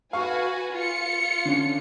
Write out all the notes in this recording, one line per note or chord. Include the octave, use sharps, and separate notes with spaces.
F#4 B4 F5 G#5 C#6
F4 C#7
D3 C#4